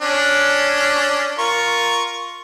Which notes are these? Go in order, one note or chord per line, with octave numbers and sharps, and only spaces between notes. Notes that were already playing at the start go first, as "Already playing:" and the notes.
C#4 D4
F4 A#4 C#6